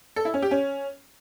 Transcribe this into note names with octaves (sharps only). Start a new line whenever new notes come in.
A4
E4
C#4
G4
C#4